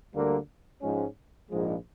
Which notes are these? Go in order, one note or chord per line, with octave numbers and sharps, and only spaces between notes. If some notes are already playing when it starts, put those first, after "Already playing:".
D2 D3 G3 A#3
G#2 F3 G#3 C#4
A#1 G#2 F3 G#3